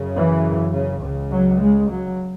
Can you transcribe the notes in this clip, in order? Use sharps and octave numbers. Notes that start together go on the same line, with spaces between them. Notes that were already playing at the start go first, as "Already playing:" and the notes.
Already playing: F#2 C#3
E3
C#3
C#2 C#3
F#3
G#3
F#3